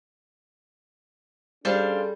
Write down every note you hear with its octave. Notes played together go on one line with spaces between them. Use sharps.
G3 C#4 D4 G#4 A4 C5 F5